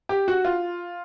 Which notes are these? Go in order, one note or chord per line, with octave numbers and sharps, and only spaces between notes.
G4
F#4
F4